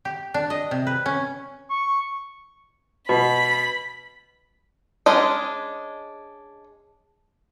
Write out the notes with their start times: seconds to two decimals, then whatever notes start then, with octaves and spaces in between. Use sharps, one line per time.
0.05 G4
0.34 D4
0.50 D#5
0.71 C3
0.87 B4
1.06 C#4
1.70 C#6
3.09 B2 B5
5.06 G#3 C#4 D4 D#5